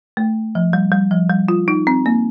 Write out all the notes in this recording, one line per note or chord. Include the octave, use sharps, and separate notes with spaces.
A3
F3
G3
G3
F3
G3
F4
D#4
C4
A#3